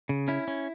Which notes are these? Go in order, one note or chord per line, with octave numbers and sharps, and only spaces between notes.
C#3
C#4 E4
C#4